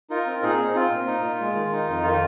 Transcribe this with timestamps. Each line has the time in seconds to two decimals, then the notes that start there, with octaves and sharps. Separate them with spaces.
0.10 D#4 F4 A#4
0.27 C4
0.43 A#2 D#4 G#4
0.60 C4
0.74 C4 F4
0.92 A#2
1.07 D#4
1.24 A#2
1.40 G#3
1.55 D#3
1.72 D#4
1.88 F2
2.03 D#3 F4